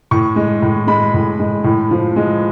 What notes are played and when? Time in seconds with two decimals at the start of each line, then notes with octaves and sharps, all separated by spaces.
0.11 A2 C#6
0.36 G#3
0.62 A2
0.87 G#3 B5
1.14 A2
1.39 G#3
1.64 A2
1.91 F3
2.16 G#3